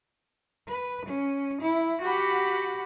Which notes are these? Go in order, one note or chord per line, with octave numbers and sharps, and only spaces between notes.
B4
C#4
E4
F#4 G4 F#5 B5